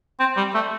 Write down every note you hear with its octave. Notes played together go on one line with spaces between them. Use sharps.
C4
G3
A3